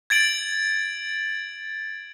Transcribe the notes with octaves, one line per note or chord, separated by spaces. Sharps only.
G#6 A6 D7 F#7